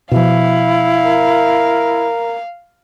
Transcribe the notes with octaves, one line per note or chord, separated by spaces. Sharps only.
B2 F3 E4 F5
A#4